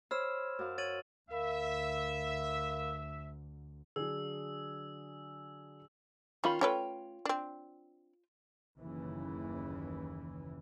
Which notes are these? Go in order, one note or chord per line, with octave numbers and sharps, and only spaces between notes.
C5 C#5 B5 E6 F6 E7
F#2 F5
C#5 A6 D#7 F#7
D2 A#4 E5 F5 B5
D3 F#3 G#4 E6
D#3 C#4 F4 B5
A3 C#4 F4 B4 C#5 G5
C4 D4
F#1 D#2 C#3 E3